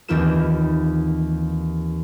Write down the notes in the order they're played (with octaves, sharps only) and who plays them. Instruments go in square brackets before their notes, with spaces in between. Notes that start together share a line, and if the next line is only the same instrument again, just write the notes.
[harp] D#2 E3 C4 F4 B4 E7